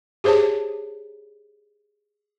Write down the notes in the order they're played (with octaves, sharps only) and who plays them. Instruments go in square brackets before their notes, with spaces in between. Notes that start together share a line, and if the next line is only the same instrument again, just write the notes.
[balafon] G4 G#4 C5 C#5 A5